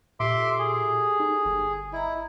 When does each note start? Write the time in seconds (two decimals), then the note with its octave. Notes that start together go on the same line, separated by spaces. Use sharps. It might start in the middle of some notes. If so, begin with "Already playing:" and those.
0.20 A#2 G4 A4 E5 C6 D6
0.59 G#4
1.20 D#4
1.45 G1
1.93 E4 D#5 A#5